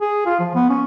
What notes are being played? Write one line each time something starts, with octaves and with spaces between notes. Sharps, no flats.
G#4
F4
F3
B3
C#4